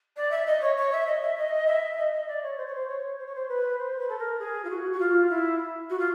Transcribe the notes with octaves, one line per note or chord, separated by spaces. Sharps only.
D5
E5
D#5
C#5
C#5
E5
D#5
E5
D#5
E5
D#5
D#5
D5
C#5
C5
C#5
C5
C#5
C5
C#5
C5
B4
C5
B4
A4
A#4
G#4
F4
F#4
F#4
F4
E4
F#4
F4